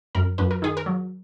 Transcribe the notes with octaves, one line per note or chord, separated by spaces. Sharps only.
F#2 A#4
F#2 B4
A#4
D#3 G#4
A#4
F#3